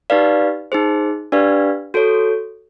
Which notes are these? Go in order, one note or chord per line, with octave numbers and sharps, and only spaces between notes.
D#4 G4 B4 D5 F5
D#4 G#4 C5
D4 G4 B4 D5 F5
F#4 A4 C#5